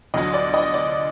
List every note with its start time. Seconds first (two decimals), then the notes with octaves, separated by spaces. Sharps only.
0.14 D2 D3 F#3 D#5
0.34 D5
0.54 D#5
0.74 D5